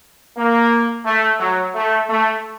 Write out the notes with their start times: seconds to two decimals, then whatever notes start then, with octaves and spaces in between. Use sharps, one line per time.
0.37 A#3
1.05 A3
1.40 F#3
1.75 A3
2.10 A3